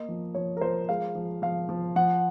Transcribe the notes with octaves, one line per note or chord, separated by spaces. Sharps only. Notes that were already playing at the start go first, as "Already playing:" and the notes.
Already playing: A#3 D#5
F3
F3 C#5
A#4
F3 C5
G#3 F5
F3
F3 F5
F3
F3 F#5